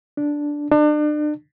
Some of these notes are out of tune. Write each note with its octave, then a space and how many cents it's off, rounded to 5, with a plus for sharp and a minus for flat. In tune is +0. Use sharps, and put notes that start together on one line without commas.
D4 -5
D4 +35